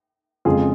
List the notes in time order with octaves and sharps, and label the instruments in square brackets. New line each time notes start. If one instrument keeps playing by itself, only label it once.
[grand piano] F2 C#3 G#3 F4 G#4